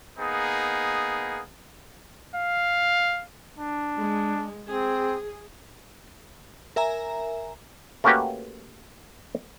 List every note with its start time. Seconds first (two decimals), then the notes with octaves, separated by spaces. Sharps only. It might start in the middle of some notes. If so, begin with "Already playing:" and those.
0.18 A#3 B3 D#4 G#4
2.36 F5
3.59 D4
3.97 G#3
4.69 C4 G#4
6.76 A#4 E5 G#5 A#5
8.04 A3 A#3 C#4 F#4 G4 B4